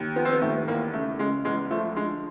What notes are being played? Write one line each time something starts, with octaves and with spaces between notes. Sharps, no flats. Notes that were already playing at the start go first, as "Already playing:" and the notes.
Already playing: D#2
F3 B3
C4
B3
D#2 A3
E2 A#3
C#3 A3
C#3 G#3
E2 G#3
F3 A3
D3 G#3